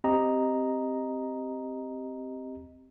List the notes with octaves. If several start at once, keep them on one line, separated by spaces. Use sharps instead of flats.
C4 G4 D#5 A#5